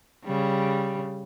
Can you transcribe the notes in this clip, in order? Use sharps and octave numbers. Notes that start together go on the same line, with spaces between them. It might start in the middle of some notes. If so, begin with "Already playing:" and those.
C#3 G3